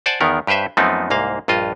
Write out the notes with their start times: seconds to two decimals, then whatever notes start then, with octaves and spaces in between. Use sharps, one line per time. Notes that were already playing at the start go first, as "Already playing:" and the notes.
0.06 C5 D5 F#5 G#5 A5
0.21 E2 D#3 B3 A#4
0.47 G2 G4 B4 C5 E5
0.77 F#2 F3 A3 B3 C4 D#4
1.10 C2 G#2 A#3 F5
1.48 A#1 G2 F4 D#5